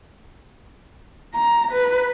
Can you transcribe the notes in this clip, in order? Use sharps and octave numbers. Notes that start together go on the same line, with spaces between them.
A#5
B4